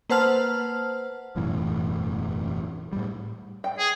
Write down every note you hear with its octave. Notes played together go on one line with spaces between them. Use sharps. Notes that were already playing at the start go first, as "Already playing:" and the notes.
A#3 B4 C5 F#5 A5 F6
E1 F#2 A2 E3
A2 G3
G5
G#4